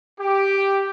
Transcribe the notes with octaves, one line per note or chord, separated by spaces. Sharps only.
G4